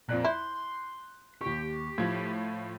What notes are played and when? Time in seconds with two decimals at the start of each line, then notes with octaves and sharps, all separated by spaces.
0.09 F2 A#2 D5 F#6
0.24 E4 C6 G6
1.41 D#2 G4 C#6
1.98 A2 F3 G#6